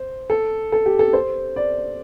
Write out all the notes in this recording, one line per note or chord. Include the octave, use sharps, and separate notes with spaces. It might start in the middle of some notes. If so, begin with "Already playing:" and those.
Already playing: C5
A4
A4
G4
A4
C5
D5